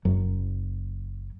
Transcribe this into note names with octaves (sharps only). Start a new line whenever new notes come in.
F#1 F#2 F#3